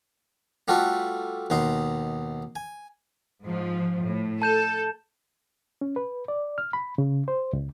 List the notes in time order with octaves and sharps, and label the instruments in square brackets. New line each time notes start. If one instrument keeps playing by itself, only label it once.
[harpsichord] G3 A3 F4 F#4 A4 B4
D#2 B2 D#4 C6
G#5
[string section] G#2 F3
A2
[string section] A4 [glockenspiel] A5 G6 E7
[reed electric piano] C#4
B4
D5
F6
B5
C#3
C5
C#2